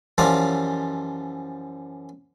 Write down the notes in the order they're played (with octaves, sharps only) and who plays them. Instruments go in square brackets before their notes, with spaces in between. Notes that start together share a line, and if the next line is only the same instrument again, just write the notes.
[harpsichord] F#2 E3 F3 G3 D5 F5